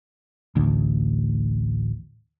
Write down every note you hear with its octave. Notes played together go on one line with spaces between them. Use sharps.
A1 D2